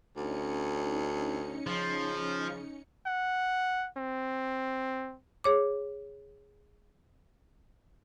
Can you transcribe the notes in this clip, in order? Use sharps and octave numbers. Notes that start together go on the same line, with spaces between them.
D2 C#4 D#4 C#7
C#3 F3
F#5
C4
G#4 C#5 D6